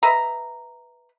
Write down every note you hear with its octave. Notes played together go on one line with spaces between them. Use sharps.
B4 D#5 E5 A#5